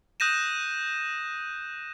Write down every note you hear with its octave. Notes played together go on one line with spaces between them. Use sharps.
D#6 F#6 G6 A#6 D#7 E7